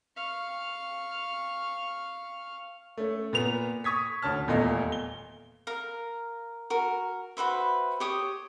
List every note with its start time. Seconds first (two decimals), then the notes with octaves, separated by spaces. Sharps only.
0.16 F5 C#6
2.97 A3 C#4
3.33 A#2 B3 F7
3.84 C#6 D#6 G#6 B6
4.23 D2 C#4 A5 F6
4.48 D#1 E2 A#2 A3 D#5 F5
4.92 G7
5.67 A#4 F5 A#5
6.70 F#4 A#4
7.37 F#4 B4 C5 E5
8.00 G4 C#5 D#6